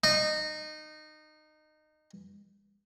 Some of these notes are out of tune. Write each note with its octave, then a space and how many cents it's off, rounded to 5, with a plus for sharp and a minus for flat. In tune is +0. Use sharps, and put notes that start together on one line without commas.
D#4 -20